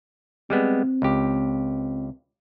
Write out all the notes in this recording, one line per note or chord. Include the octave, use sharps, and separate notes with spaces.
G3 G#3 B3 C4
C#2 G4